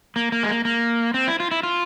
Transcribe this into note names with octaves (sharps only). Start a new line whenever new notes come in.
A#3
A#3
G#3
A#3
A#3
C4
E4
F4
E4
F4